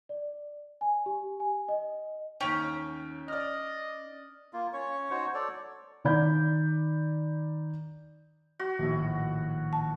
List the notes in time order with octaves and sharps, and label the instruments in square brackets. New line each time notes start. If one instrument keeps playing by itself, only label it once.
[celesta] D5
G#5
G4
G#5
D#5
[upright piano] D#2 G5 [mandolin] C#4
[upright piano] D5 F6 [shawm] D#5
[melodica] A#3 F4
C#4 C#5 C#6
D#4 F#4 C5 C#5
A4 C#5 D5
[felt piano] D#3 D5 B5 G6
[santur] F#4
[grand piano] A#1 A2 [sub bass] D#3
[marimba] A5